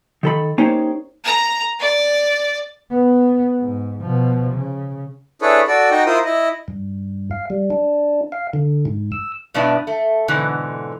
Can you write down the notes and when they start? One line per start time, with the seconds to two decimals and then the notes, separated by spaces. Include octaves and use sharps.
0.23 D#3 A4 B5
0.58 A#3 C#4 D#4 G4 C5 C#5
1.25 A#5
1.79 D5
2.90 B3
3.59 G#2
4.01 B2 F3
4.53 C#3
5.42 D4 E4 G#4 A4 B4 C#5
5.68 F#4 A4 D5
5.91 D#4 F#4 D#5 G5
6.06 E4 F4 A#4 C5 D#6
6.25 E4 D#5
6.68 G2
7.31 F5
7.50 G3
7.70 D4
8.32 F5
8.53 D3
8.85 G#2
9.12 E6
9.54 G2 B2 B3 D4 E4
9.87 A3
10.28 G#2 B2 D3 E3